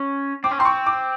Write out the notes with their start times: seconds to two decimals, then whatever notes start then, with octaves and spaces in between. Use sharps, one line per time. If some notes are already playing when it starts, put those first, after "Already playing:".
Already playing: C#4
0.44 C4 D6
0.51 C#4
0.58 C4 C6
0.65 C#6
0.86 D6